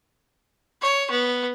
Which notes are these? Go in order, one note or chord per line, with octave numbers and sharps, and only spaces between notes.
C#5
B3